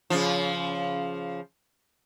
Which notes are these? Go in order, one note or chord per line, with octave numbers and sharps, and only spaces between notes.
C#3 F3